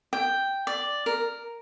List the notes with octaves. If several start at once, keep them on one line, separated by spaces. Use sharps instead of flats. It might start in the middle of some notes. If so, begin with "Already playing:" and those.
G5
D5
A#4